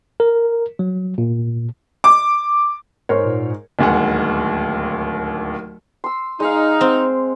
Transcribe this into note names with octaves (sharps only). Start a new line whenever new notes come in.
A#4
F#3
A#2
D6
G#2 A#4 C5 C#5
A#2
D1 D#2 G#3 F#5
C6 E6
G#3 D#4 F5
C4